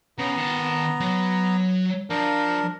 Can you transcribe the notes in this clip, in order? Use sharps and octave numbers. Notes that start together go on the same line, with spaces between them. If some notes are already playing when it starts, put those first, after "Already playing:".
C#3 B3 A#5
D#3 A5
F#3
F3 D4 A#4